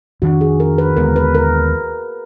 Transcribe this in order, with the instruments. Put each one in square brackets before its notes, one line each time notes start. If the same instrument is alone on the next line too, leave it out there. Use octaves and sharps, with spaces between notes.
[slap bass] F2 D#3 A#3 D4 [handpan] F#4
[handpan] G#4
A#4
B4
[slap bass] D#2 D3 G#3 B3 [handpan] A#4
[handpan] B4
A#4